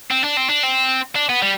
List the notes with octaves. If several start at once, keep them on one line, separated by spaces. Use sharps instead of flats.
C4
D4
C4
D4
C4
D4
B3
G3